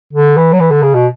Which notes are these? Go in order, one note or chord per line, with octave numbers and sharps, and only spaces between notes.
D3
E3
F#3
E3
D3
C#3
B2